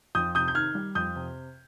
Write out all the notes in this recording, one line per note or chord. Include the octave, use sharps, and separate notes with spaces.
F2 D#6 G6
C3 D#6 G6
G6
D#3 F6 G#6
G3
F2 D#6 G6
C3